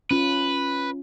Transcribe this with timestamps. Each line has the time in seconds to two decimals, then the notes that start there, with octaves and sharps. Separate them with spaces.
0.11 C#4 F4 B4